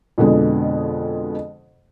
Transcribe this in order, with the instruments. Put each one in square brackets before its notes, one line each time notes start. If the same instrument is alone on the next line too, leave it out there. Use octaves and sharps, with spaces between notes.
[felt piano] F2 B2 D3 G#3